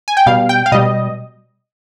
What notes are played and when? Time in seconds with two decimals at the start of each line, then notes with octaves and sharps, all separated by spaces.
0.08 G#5
0.17 G5
0.26 B2 G3 F5
0.49 G5
0.66 F5
0.72 B2 G3 D#5